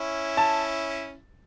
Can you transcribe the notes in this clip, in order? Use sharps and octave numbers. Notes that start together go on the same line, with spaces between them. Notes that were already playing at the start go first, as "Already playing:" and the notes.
Already playing: C#4 E4
A5